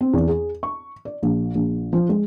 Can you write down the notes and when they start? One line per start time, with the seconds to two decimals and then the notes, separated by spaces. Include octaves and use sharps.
0.01 C4
0.13 E2
0.28 G#4
0.63 C#6
1.05 D5
1.23 A#1
1.55 A#1
1.93 F3
2.09 G#3